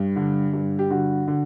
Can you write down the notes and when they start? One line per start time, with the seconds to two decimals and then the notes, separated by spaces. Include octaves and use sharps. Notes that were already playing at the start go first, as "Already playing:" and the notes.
Already playing: G2
0.16 D3
0.54 G2
0.79 G4
0.90 D3 F#4
1.28 D3